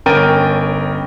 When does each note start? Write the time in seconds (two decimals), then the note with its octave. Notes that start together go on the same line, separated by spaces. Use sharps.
0.06 G1 C#4 A#4 G5 A6 D#7